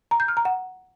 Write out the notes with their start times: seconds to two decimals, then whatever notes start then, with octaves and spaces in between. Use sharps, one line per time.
0.11 A#5
0.20 G6
0.28 F6
0.37 A#5
0.45 F#5